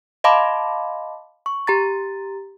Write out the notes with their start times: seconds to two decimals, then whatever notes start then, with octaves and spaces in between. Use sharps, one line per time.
0.24 D#5 F5 A5 B5 C6 D6
1.46 C#6
1.67 G4 A#5 A6